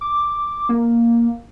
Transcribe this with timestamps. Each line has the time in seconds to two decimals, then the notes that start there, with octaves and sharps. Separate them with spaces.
0.01 D6
0.69 A#3